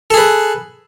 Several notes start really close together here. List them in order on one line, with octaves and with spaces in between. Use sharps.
A4 G#4 B4